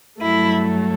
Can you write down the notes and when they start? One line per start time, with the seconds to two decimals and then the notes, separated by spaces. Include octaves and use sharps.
0.20 G2 F#3 A3 E4